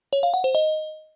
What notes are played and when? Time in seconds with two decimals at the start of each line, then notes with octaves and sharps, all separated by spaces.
0.13 C#5
0.23 F5
0.34 F#5
0.44 C5
0.55 D#5